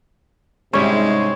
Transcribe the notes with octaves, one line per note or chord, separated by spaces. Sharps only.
G#2 C3 G3 G#3 C4 C#4 E4 C#5